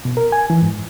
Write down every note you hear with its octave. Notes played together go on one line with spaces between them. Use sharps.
B2
A#4
G#5
E3
G#2